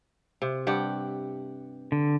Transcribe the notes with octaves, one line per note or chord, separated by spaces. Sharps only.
C3
G2 G4 F#5
D3